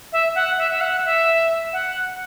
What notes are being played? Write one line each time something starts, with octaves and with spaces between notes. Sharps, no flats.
E5
F#5
E5
E5
F#5
E5
F#5